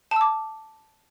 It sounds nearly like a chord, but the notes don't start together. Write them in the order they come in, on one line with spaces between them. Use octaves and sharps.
A5 E6 D6